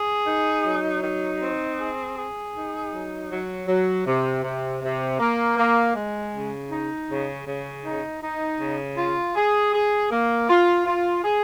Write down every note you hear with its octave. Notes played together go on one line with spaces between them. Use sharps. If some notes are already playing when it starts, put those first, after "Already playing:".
Already playing: G#4
D#4
F#3
D#4
C4
G#4
G#4
D#4
F#3
F#3
F#3
C3
C3
C3
A#3
A#3
G#3
C#3
D#4
C#3
C#3
D#4
D#4
C#3
F4
G#4
G#4
A#3
F4
F4
G#4